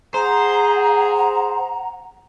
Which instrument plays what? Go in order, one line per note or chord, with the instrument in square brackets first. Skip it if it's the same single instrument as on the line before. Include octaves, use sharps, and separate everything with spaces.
[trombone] G#4 [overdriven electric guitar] C5 [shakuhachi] F#5 [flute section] A#5